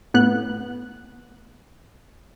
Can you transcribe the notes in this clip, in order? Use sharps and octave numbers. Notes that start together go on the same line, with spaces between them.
A2 B3 F#6